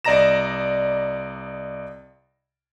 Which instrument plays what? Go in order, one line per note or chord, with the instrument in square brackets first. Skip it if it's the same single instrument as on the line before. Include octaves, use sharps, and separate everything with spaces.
[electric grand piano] C2 D5 D#5 A#5 A#6 E7